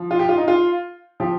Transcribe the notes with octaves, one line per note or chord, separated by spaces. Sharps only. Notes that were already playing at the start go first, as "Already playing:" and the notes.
Already playing: F3
F4
G4
F4
D#4
F4
F3 G4